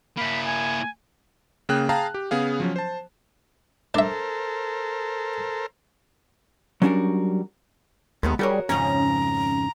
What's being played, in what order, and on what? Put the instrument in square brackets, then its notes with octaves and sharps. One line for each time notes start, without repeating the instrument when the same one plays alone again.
[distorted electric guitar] A#3 E4 [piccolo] B5
[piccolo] G#5
[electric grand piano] C#3 A#3 G#4 G5 F#6
G#4 F5 G5 A5 A#5
G4
C#3 B3 G#4 F5
F3 F#3 C#4
C5 A5
[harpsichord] D4 E5 [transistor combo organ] A4 A#4 C5
[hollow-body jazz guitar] F#3 G3 C#4 D4 F#4 A#4
[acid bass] D#2 [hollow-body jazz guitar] G#3 A3 B3
[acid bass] G3 [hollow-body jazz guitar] F#4 A#4 C#5 [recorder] G#4
[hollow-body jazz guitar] F2 G#2 C#3 [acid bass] C#4 [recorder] A#5